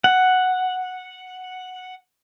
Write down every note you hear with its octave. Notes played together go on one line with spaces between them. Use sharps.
F#5